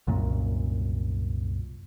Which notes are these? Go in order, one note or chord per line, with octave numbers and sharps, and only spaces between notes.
C2 F#2 A#2